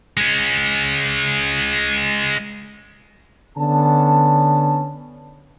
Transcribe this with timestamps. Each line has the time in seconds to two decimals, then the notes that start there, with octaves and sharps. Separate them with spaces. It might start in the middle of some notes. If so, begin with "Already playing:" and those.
0.17 G#3 C#4
3.57 D3 B3 C#4 A5